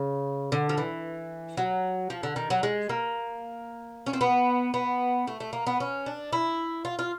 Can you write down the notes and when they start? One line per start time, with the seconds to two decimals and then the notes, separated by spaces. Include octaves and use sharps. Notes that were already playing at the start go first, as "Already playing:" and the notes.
Already playing: C#3
0.52 D3
0.69 F3
0.78 E3
1.57 F#3
2.10 F3
2.23 D3
2.36 D#3
2.50 F#3
2.63 G#3
2.89 A#3
4.06 C#4
4.13 C4
4.21 B3
4.74 B3
5.27 A3
5.40 A3
5.53 A#3
5.67 B3
5.80 C#4
6.06 D4
6.33 E4
6.85 F4
6.99 F4